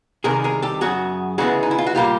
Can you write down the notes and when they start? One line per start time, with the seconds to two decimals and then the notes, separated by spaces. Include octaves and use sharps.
0.24 C2 C3 D#3 G#4 A#4
0.44 G#4 A#4
0.62 G4 A4
0.81 F#2 C#3 F#3 F#4 G#4
1.38 D2 C#3 E3 G#3 B3 F#4 G#4
1.63 D#4
1.71 E4
1.78 F4
1.86 F#4
1.95 A#2 G3 A#3 F4 G4